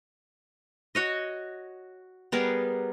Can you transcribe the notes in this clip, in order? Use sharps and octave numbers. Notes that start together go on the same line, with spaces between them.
F#4 C#5 D#5
G3 B3 G#4 A#4